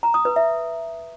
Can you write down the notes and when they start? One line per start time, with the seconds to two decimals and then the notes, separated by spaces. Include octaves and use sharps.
0.03 A#5
0.14 D#6
0.25 B4
0.36 E5